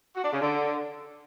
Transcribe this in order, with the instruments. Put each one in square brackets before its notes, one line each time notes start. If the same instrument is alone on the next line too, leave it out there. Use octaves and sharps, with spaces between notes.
[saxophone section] F#4
D4
C#3
D3